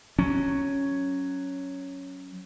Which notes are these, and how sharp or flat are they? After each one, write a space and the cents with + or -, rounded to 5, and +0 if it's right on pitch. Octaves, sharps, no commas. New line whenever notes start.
F#3 +0 C#4 +0